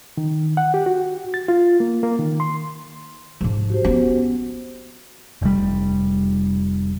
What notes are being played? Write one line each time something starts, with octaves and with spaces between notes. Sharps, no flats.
D#3
F#5
G4
F#4
A6
F4
A#3
A#3
D#3
C6
G#2 F3
F#4 G4 C5
B3 C#4
F1 G3